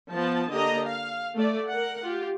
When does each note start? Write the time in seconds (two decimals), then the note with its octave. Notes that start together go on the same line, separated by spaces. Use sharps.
0.12 F3 B3 A5
0.51 D3 A#3 D4 G4 D#5 A#5
0.86 F5
1.36 A3 D5
1.69 A#4 F#5
2.03 F4 G4